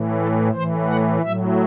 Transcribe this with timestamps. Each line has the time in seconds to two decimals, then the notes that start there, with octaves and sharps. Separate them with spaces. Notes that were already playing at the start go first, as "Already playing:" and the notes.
Already playing: A2 E3
0.17 A4
0.52 A2 E3 C5
0.87 F#5
1.22 A2 F#3 E5